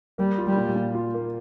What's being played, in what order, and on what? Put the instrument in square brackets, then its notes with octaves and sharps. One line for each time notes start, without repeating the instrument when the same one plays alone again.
[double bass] G3 [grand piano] A#3
[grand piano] F4
[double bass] G3
[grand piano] A#2
A#2
F4
A#3